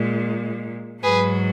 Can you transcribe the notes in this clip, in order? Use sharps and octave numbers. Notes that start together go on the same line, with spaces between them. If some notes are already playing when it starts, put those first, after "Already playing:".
Already playing: A#2 G#3
G#2 F#3 G#4 B4